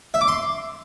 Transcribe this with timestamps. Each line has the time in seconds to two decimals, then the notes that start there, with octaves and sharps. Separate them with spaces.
0.14 E5
0.21 D6
0.28 C6